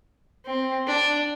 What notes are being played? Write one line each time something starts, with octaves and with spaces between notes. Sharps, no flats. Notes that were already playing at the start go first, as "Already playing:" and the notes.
C4
D4